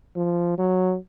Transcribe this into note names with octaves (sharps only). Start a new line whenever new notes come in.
F3
F#3